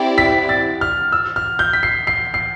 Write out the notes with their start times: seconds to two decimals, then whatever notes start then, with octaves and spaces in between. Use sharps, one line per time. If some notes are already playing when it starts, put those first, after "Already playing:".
Already playing: C4 E4 G4 D5
0.18 B6
0.49 A6
0.81 F6
1.12 E6
1.36 F6
1.59 G6
1.73 B6
1.83 C7
2.07 C7
2.34 C7